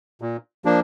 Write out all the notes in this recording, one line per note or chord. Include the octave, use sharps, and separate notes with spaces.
A#2
F3 A#3 D4